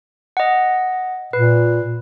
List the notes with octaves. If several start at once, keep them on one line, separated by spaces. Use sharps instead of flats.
D#5 F#5
A#2 B4